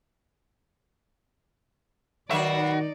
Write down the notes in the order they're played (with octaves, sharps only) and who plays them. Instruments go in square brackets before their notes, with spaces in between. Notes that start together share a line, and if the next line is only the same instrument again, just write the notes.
[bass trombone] D#3 [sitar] F#3 B4 E5 [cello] D#4 D5 [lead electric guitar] F#4